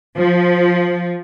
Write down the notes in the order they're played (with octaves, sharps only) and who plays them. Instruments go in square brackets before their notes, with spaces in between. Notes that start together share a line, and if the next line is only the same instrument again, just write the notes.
[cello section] F3